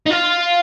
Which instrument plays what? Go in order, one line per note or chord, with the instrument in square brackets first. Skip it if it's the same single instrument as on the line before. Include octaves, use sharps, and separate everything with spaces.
[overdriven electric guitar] D#4
F4